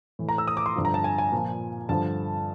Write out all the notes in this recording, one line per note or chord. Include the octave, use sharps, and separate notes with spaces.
A2 E3
A#5
E6
D#6
D6
C6
G2 D3 F3
A#5
A5
G#5
G#5
A#2 F3
G2 D3 F3 A5